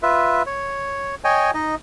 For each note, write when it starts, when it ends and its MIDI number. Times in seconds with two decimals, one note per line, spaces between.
0.02 0.42 65
0.02 0.42 71
0.02 0.42 76
0.46 1.15 73
1.24 1.51 73
1.24 1.51 75
1.24 1.51 79
1.24 1.51 80
1.54 1.75 63
1.54 1.75 75